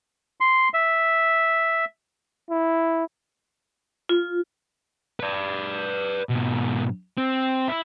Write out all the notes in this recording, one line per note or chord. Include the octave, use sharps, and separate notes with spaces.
C6
E5
E4
F4
B4 D5
G#2 B2
C4
E4